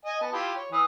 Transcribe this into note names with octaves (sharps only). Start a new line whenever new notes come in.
D#5 G#5
B3 A5
E4 F4 G4
C#5
E3 D#6